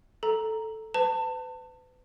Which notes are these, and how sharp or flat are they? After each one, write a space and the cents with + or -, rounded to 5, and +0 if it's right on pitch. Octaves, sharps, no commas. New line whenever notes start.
A4 +0 A#5 +0
B4 +35 A5 +30